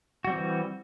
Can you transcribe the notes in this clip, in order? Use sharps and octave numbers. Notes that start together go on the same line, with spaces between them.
E3 G3 C4 F#4